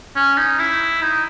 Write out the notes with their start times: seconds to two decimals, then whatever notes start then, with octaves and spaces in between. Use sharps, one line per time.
0.16 C#4
0.38 D#4
0.59 E4
1.02 D#4